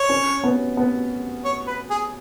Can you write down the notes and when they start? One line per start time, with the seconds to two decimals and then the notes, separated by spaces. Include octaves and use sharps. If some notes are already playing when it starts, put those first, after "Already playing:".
Already playing: C#5
0.09 C#4
0.44 B3
0.77 B3
1.45 C#5
1.67 B4
1.90 G#4